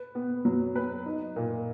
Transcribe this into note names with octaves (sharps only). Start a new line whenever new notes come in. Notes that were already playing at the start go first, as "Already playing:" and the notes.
Already playing: B4
B3
F#3
B4
D#4
A#2